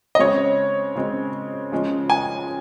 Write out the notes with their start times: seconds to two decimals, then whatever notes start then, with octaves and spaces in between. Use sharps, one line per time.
0.15 D#5
0.19 C#3 G#3 C4 C#5
0.96 C#3 G#3 C4
1.72 C#3 F3 G#3 C#4
2.10 G#5